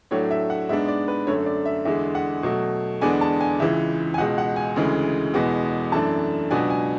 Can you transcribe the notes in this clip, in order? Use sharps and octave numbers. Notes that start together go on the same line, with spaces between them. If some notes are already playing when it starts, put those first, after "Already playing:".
A2 F#3 A3 D4 C#5
E5
F#5
G#2 G#3 B3 D4 E5
D5
B4
F#2 D3 A3 C#5
D5
E5
E2 D3 G#3 E5
F#5
B2 F#3 A3
E2 D3 G#3 B3 D4 G#5
A5
G#5
C#2 C#3 E3 G#3 E5
G#5
C#2 B2 G#3 F#5
F#5
G#5
D2 C#3 E3 G#3
E2 B2 G#3 B3
F#2 E3 A3 D4 A5
C#2 B2 F#3 B3 D4 G#5
G#5